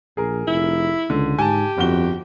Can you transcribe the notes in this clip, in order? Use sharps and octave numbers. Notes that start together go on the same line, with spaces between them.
A#1 G#4 A#4
F1 E4
C#2 D3
G#2 G4 G#5 A5
G1 F2 F#4 G7